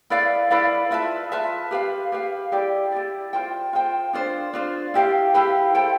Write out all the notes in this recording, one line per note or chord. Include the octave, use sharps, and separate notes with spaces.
E4 B4 D5 F5
E4 B4 D5 F5
F4 B4 E5 A5
F4 B4 E5 A5
G4 B4 F5
G4 B4 F5
E4 G4 D5
E4 G4 D5
F4 C5 G5
F4 C5 G5
D4 F4 C5
D4 F4 C5
E4 G4 B4 F5
E4 G4 B4 F5
E4 A4 C5 G5